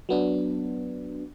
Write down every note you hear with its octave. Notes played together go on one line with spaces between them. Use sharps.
F#3 B3 D4